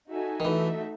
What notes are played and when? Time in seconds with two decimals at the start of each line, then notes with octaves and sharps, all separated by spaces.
0.09 D#4 F#4 A4 E5 G#5
0.40 D#3
0.45 E3 A3 D#4 F#4 A4 E5